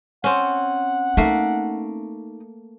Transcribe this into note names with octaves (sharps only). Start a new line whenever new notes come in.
C4 C#4 F#5
A3 A#3 D#4